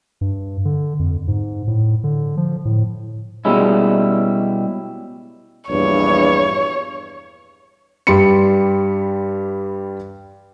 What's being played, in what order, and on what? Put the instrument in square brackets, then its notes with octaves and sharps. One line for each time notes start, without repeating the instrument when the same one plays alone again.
[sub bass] G2
D3
F2
G#2
A2
D3
F3
A2
[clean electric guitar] B2 G3 G#3 C#4 E4
[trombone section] A#1 E2 G2 [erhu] C#5
[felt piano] G2 G3 B5 C6 C#7